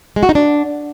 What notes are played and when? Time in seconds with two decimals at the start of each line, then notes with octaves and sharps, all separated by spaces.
0.16 G#3
0.23 F#4
0.29 D#4
0.35 D4